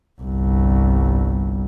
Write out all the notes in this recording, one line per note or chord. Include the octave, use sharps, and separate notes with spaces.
G1 C2